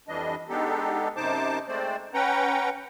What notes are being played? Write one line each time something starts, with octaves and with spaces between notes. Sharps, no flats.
F2 E3 G3 D4 D#5
G#3 B3 D4 D#4 G4 A4
F#2 C3 D#4 C5 A5 D6
G#3 A3 C4 C5 D5
C#4 B4 F#5 G5 A#5